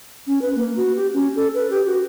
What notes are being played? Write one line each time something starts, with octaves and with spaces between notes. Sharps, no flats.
C#4
B4
A#3
F#4
G4
C#4
A4
B4
G4
F#4